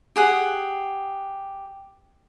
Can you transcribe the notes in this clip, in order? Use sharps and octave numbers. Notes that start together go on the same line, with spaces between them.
G4 G#4 F#5